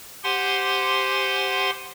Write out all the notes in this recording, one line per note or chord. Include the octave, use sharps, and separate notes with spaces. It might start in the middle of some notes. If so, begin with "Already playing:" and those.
G4 C5 F#5 G#5 C6